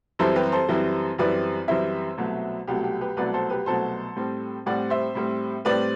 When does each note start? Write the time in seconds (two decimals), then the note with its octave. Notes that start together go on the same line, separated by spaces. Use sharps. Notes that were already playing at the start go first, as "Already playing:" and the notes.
0.19 F#2 E3 G3 C4 E4 A4 C5
0.36 G4 B4
0.52 A4 C5
0.69 F#2 E3 G3 C4 E4
1.18 F#2 E3 G3 C4 E4 B4 D5
1.68 F#2 E3 G3 C4 E4 C5 E5
2.17 C2 B2 F#3 A3
2.67 C2 B2 F#3 A3 G4
2.84 G4
3.01 G4 B4
3.17 C2 B2 F#3 A3 B4 D5
3.34 A4 C5
3.50 G4 B4
3.66 C2 B2 F#3 A3 A4 C5
4.16 A2 G3 C4
4.66 A2 G3 C4 D5 F#5
4.90 C5 E5
5.15 A2 G3 C4
5.65 A2 G3 C4 B4 D5